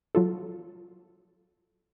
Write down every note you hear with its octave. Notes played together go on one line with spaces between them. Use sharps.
F#3 F4 A4